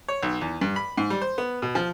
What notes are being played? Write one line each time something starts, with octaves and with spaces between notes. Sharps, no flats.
C#5
B1
E2
G2
B5
G#2
G3
C5
B3
B2
F3